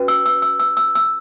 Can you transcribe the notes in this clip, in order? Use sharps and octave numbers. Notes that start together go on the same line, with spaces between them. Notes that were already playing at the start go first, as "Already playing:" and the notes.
Already playing: C#4 F#4 B4
E6
E6
E6
E6
E6
E6